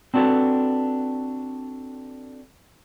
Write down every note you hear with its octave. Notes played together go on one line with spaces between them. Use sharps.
C4 D4 F#4 G4 A4 B4